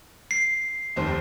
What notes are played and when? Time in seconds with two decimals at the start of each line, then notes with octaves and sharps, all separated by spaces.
0.31 C7
0.96 F1 D#2 C5